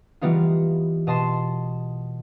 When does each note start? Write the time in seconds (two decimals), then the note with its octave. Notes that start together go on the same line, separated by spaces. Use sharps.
0.21 E3 G3 B3 D#4 F4
1.07 B2 D#5 A5 C6 E7